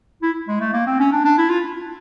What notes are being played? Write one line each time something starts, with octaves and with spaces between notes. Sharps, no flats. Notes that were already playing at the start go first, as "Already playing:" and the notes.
E4
G#3
A3
A#3
C4
C#4
D4
D4
E4
F4